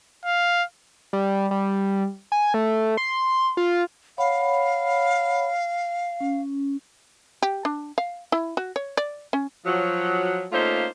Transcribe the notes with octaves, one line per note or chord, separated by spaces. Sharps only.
F5
G3
G3
G#5
A3
C6
F4
C#5 F5 F#5 B5
C#4
G4
D4
F5
E4
F#4
C#5
D5
C#4
F3 F#3
A3 A#3 C#4 D#4 F4 C5